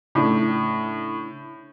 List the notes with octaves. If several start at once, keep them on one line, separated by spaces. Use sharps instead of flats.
A2 C#3 D4